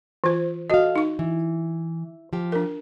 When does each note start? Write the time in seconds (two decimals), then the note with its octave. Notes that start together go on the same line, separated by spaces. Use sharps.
0.24 E3 F4 C5
0.70 F#4 A4 D#5 F5
0.96 D#4 C#6
1.19 E3
2.33 F3 G4
2.52 D4 A#4